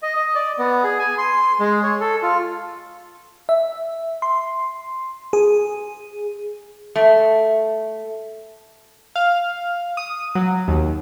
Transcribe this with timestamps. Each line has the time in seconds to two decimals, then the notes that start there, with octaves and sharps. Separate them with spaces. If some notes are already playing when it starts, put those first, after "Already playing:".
0.03 D#5
0.16 D#5
0.35 D5
0.59 B3
0.84 G#4
0.99 G#5
1.18 C6
1.60 G#3
1.83 C#5
2.01 A4
2.23 F4
3.49 E5
4.22 C6
5.33 G#4
6.96 A3
9.16 F5
9.97 D#6
10.35 F#3
10.68 D#2